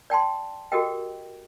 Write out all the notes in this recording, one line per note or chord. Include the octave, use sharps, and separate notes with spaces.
D5 G5 A5 C6
F#4 G4 A4 A#4 D#5 G5